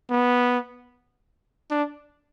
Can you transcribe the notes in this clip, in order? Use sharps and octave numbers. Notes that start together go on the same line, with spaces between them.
B3
D4